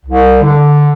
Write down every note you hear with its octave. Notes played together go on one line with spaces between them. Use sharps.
C2
D3